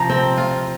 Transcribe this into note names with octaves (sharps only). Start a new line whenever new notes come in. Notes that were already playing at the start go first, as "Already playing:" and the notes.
Already playing: C3 F3 A#5
C4
F4